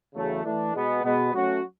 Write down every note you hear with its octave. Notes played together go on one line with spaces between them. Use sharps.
E2 C#3 F#3 A3
E3 A3 D4
B2 G#3 B3
B2 G#3 B3
F#3 A3 C#4 F#4